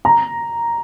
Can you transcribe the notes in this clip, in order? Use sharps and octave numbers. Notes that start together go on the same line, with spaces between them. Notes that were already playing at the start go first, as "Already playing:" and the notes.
A#5